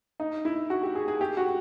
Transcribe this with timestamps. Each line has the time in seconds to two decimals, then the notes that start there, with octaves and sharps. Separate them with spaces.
0.20 D#4
0.45 E4
0.70 F#4
0.83 G4
0.95 G#4
1.08 G#4
1.21 G4
1.37 F#4